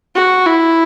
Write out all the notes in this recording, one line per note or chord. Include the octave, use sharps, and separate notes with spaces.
F#4
E4